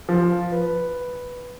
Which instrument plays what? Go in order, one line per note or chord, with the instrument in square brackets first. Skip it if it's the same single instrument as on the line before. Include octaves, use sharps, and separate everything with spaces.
[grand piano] F3
B4